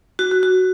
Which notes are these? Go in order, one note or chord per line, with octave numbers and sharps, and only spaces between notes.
F#4
F#4
F#4